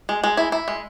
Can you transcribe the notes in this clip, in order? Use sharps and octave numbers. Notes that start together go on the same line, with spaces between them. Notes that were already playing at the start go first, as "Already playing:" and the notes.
G#3
G#3
E4
E4
G#3